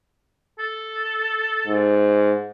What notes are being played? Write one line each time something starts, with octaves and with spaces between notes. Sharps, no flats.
A4
G#2